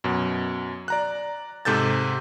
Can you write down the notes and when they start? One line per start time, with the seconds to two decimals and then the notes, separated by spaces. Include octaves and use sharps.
0.04 F#2 B2
0.88 D5 A#5 F#6
1.65 G#2 C3 A4 G6 A6